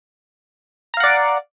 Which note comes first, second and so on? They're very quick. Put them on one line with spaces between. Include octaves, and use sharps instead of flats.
A#5 F5 F#5 D5